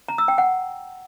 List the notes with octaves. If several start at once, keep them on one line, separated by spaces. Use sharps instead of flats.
A#5
E6
G5
F#5